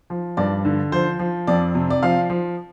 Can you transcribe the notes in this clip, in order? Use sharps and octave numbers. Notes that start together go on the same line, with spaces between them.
F3
G2 D5
D3
F3 C5
F3
F2 D5
C3
D5
F3 F5
F3